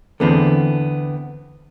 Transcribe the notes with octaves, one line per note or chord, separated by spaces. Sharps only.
E2 D3 A3 B3 C4